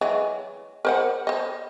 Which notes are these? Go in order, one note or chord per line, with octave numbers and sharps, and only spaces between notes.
E3 F#3 G#3
A#4 C5 F#5
C5 D#5